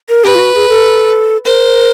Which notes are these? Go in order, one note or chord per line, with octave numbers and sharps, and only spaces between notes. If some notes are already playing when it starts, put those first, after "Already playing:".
A#4
G4 B4
F4
F#4
G#4
A4
A#4 C5